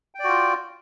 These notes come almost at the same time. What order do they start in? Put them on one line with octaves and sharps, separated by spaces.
G5 D5 F#4 F4